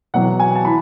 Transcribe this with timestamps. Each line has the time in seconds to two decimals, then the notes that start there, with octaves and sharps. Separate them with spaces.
0.14 E2 B2 F#3 F#5
0.40 G#5
0.55 A5
0.65 E3 B5